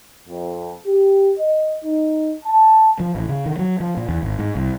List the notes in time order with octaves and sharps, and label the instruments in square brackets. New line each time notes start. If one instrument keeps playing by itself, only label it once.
[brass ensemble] F2
G4
D#5
D#4
A5
[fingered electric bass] F3
A1
C#3
D#3
F#3
F3
A#2
E2
G#1
G#2
C2